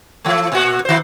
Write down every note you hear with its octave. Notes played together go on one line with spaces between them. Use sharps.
E3 A3
A#2 F#4
D#3 C5